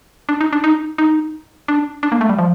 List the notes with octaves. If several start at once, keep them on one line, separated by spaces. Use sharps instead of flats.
D4
D#4
D4
D#4
D#4
D4
D4
A#3
A3
G3
F3